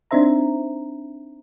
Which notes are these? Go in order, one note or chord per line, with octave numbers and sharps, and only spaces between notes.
C4 D4 D#4 C5 E5 A#5